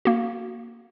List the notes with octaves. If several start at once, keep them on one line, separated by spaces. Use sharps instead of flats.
A#3 F#4